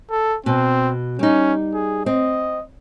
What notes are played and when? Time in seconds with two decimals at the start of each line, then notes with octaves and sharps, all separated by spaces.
0.10 A4
0.46 B2 C4
1.19 G3 C#4 D#4
1.74 G#4
2.06 C4 D#5